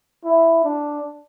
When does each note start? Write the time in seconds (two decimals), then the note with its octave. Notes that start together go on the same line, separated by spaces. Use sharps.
0.25 E4
0.64 D4